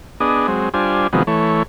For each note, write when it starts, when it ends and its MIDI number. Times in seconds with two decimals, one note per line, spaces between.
0.20 0.47 59
0.20 0.47 62
0.20 0.47 68
0.20 0.47 75
0.48 0.69 54
0.48 0.69 56
0.48 0.69 60
0.74 1.07 55
0.74 1.07 62
0.74 1.07 65
0.74 1.07 72
0.74 1.07 80
1.13 1.23 48
1.13 1.23 51
1.13 1.23 53
1.13 1.23 54
1.13 1.23 56
1.13 1.23 59
1.27 1.63 52
1.27 1.63 57
1.27 1.63 73